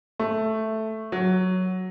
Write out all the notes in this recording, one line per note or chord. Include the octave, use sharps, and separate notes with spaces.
A3
F#3